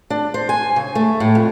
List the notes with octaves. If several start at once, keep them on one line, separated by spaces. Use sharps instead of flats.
D4
C5
G#5
C#3
A3
A2
F2